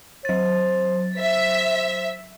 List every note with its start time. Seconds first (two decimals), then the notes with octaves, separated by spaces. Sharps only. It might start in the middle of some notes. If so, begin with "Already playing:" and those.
0.25 F#3 C5 A6
1.16 C5 E5 B6